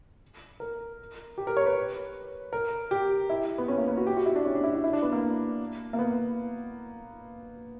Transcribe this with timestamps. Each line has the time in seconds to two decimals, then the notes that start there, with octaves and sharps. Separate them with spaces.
0.60 A#4
1.38 G4
1.47 A#4
1.57 C#5
1.66 B4
2.53 A#4
2.91 G4
3.30 E4
3.58 B3
3.68 C#4
3.78 A#3
3.87 B3
3.97 F#4
4.07 G4
4.16 F#4
4.26 E4
4.36 D4
4.45 C#4
4.55 D4
4.64 E4
4.74 E4
4.84 E4
4.93 D4
5.02 B3
5.12 A#3
5.93 A#3
5.99 B3